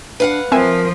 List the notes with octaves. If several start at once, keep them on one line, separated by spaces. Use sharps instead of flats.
D4 B4 F5 F#5
F3 C4 A#4 E5 G#5